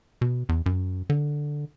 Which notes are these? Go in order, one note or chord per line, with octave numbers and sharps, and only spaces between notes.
B2
E2
F#2
D3